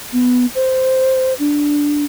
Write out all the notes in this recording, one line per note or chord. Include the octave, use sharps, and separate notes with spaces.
B3
C5
D4